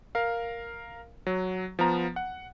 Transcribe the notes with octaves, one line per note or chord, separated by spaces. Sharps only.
A#4 F5
F#3
F3 B3 A#5
F#5